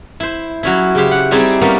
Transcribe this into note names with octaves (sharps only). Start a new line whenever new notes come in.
E4 C5
F#3 C#4 E4
C#3 E4 G4 C5
F#5
G3 C4 D#4 E4 G4 G#4
G3 A#3 B3 C#4 D#4